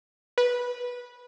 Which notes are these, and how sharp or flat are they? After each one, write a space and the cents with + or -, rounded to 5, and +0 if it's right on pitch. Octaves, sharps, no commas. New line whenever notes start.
B4 -15